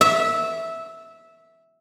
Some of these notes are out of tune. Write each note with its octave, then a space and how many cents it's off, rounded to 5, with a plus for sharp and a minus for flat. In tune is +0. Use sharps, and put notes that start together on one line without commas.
E5 -10